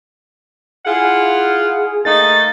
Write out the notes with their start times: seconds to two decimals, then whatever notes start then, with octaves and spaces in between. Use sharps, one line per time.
0.86 E4 F4 G#4 F#5
2.05 A3 A#3 D#4 A6